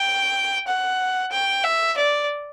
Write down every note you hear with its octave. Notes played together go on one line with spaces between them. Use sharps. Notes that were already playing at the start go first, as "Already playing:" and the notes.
Already playing: G5
F#5
G5
E5
D5